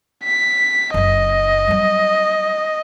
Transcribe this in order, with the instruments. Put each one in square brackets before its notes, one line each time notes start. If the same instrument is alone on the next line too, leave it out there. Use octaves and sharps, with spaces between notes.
[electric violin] B6
[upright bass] F#1 F#2 [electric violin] D#5
[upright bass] F#3 G3